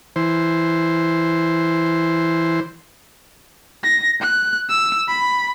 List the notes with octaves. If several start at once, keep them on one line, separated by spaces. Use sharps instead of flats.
E3 C5
A#6
F#6
E6
B5